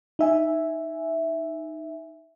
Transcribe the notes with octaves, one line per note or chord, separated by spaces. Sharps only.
D#4 E5 G#5